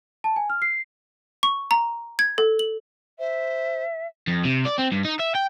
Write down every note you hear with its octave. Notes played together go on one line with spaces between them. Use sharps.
A5
G#5
F6
C7
C#6
A#5
G#6
A4
F#7
C5 E5
F2
C3
D5
C4
G2
D#4
E5
G5